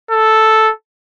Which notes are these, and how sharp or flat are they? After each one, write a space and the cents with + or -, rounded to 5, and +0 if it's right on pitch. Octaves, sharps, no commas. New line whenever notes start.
A4 -5